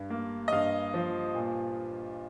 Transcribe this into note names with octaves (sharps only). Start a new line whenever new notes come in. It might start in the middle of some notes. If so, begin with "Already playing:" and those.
Already playing: G2
A#3
D#5
G2 F5
F3
A#2